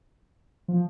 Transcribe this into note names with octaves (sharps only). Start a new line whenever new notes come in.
F3